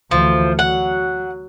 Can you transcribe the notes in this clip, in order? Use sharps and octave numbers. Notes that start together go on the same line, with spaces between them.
D2 E3 F3
F#3 F#5